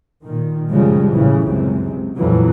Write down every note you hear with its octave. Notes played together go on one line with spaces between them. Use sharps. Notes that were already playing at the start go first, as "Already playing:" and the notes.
A#2 D#3
F#2 C#3 F3 G3 G#3
A1 C#3 E3
C#2 F#2 C3 G#3
F2 A#2 E3 F#3